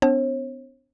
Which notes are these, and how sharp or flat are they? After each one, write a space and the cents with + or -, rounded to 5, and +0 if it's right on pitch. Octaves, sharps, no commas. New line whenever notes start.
B3 +45 D4 -20 C#5 -45